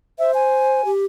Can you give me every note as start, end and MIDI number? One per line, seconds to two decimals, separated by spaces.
0.19 0.84 72
0.19 0.32 76
0.34 0.90 80
0.84 1.05 67